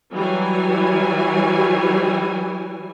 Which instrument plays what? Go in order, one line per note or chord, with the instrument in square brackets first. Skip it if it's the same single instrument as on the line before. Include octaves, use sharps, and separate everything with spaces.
[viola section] E3 F#3 G3 G#5